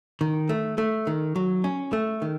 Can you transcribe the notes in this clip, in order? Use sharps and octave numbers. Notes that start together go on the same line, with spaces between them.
D#3
A3
A3
D#3
F#3
C#4
A3
D#3